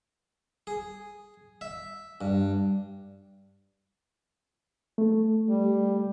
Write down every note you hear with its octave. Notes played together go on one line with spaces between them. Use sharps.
G#4
E5
G2
A3
G3